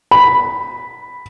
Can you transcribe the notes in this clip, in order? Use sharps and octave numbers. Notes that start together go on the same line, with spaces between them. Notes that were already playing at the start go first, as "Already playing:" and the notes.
B5